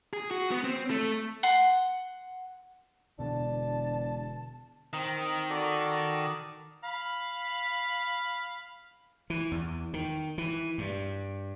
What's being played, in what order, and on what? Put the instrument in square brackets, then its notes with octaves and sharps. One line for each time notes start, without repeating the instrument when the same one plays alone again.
[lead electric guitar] G#4
F#4
B3
C4
A3
[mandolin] F#5 C6
[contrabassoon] E1 [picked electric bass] B2 D3 [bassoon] D4 [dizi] A5
[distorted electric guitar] D#3 [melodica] C4 A#5
[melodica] F#4 A4 D5
[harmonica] F5 B5
[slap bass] E3
E2
D#3
E3
G2